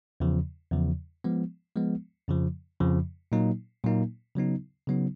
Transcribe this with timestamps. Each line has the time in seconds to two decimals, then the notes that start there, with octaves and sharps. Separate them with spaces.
0.20 E2 C#3 F3
0.72 E2 C#3 F3
1.24 F3 G#3 B3
1.76 F3 G#3 B3
2.28 F2 C#3 F3
2.80 F2 C#3 F3
3.32 A#2 F#3 A#3 D#4
3.84 A#2 F#3 A#3 D#4
4.35 C#3 F#3 B3 D#4
4.87 C#3 F#3 B3 D#4